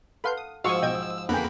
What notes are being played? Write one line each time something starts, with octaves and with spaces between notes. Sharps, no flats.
A4 B4 F5 F#5 C6 G6
D#6
G#2 F3 F#4 F5 G#5 C#6 E6
B1 D#5 G5 G#6
F2 D3 A#3 B3 G#4 F#5 G5 B5